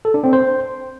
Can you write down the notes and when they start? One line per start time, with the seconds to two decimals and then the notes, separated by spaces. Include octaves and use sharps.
0.05 A4
0.14 D4
0.24 C4
0.33 C5